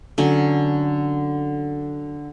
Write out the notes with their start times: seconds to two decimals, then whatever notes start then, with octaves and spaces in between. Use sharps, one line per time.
0.18 D3 F#3 C#4